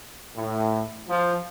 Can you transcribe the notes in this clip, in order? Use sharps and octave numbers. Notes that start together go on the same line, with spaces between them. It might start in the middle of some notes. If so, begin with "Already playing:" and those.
A2
F3